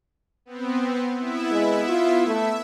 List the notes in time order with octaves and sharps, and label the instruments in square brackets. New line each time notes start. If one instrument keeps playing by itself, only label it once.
[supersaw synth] B3 C4
B3 E4 E5
[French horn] G#3
F4
[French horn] A3 [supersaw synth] E5